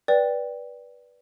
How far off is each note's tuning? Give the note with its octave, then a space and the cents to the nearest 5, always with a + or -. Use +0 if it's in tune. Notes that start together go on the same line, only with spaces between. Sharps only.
B4 -20 D5 -5 G5 +0